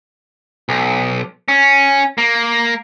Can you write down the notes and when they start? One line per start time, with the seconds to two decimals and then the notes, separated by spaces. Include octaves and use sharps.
0.69 B1
1.48 C#4
2.18 A#3